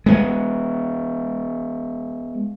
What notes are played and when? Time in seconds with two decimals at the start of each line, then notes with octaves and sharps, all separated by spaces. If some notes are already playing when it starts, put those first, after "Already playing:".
0.06 G#3 B3